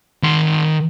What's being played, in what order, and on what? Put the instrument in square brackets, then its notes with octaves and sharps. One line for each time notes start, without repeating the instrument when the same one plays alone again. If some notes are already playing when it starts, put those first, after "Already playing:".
[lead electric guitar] D#3 C6